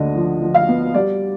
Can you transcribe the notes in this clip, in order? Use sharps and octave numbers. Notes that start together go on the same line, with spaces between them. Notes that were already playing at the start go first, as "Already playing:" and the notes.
Already playing: D2 D3 D#5
F3
F3
F5
B3
G3 D5